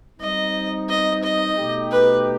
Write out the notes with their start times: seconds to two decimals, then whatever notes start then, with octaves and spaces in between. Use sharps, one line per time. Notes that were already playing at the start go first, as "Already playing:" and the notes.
0.20 G3 C4 D#4 D#5
0.89 D#5
1.23 D#5
1.57 B2 A3 D#4 G4
1.91 B4